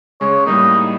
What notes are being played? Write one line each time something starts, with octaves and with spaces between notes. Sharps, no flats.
C#3 G#3 C#5
A2 G3 A#3 D#4